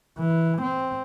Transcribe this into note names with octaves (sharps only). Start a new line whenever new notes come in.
E3
C4